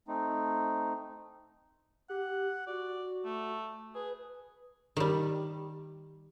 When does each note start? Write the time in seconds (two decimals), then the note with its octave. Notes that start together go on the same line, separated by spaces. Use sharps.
0.08 A3 C4 D#4
2.10 G4 F#5
2.67 F#4 D5
3.25 A3
3.95 G#4 B4
4.97 D#3 G3